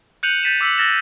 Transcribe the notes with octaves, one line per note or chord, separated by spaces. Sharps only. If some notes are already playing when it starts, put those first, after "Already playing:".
F#6 G6 C#7 D#7 F7 F#7
G6 A6 B6 D#7 E7
D6 E6 B6 C#7 F#7
E6 F6 A6 A#6 E7 F#7